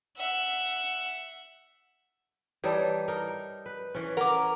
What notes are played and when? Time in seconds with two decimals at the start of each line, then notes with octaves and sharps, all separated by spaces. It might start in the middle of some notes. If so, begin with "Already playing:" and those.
0.17 E5 F#5
2.64 E3 G3 D#4 C#5 D5 A5
3.08 D#4 A#4
3.66 B4
3.95 E3 C#4
4.17 C#4 A#4 F#5 D6